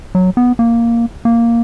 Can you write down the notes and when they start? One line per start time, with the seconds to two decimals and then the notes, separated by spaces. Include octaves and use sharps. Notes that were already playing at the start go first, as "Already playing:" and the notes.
0.15 F#3
0.37 B3
0.59 A#3
1.25 A#3